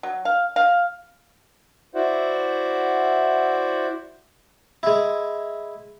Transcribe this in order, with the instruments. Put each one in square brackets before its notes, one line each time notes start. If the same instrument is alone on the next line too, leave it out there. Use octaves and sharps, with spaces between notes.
[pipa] F#3
F5
F5
[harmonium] E4 F#4 C5 D5 E5 F#5
[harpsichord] G#3 E4